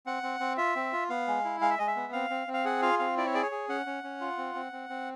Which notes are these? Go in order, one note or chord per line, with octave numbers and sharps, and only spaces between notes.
C4 F#5
C4
C4
F4 E5
C4
F4
B3 F5
G#3
E4
G#3 F5
E5
G#3 D#5
E5
B3
C4 F5
C4
C4
F5
G#4 F#5
F4 F5
C4 F5
E4 D5
C#5
G#4 D5
C#5
G#4
C#4 F#5
C#4
C#4
F4
C4
C4
C4
C4